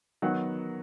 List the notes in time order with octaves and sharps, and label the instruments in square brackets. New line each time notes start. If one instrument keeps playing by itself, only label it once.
[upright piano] D#3 F#3 B3 F#5